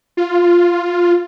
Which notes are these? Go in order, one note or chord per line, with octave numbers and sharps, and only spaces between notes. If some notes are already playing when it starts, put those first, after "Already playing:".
F4